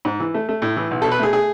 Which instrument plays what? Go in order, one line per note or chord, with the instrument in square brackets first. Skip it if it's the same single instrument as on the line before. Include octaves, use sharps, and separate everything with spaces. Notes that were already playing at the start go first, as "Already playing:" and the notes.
[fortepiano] G#2
E3
A3
A3
A2
E3
B1
B2 A4
B4
A3 G#4
G#4